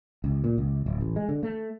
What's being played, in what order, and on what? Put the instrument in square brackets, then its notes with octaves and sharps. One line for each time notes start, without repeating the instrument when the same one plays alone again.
[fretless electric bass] C#2
A#2
C#2
D1
A1
G#3
D3
A3